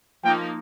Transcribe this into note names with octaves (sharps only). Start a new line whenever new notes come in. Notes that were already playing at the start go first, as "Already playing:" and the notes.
F3 A#3 D#4 G5